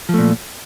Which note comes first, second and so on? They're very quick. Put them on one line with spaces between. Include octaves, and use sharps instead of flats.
F3 A3 A#2